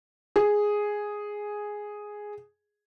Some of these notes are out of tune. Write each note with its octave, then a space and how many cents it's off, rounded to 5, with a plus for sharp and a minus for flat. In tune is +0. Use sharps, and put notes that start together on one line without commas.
G#4 +0